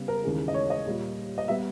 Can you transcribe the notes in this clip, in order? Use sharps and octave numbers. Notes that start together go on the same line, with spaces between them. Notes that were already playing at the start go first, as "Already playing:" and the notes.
Already playing: C#3 G3 B3
A#4
D#2 C#3 E3 G#3
D#5
C#5
D#5
A#2 G3 A#3
D#5
G3 B3 E5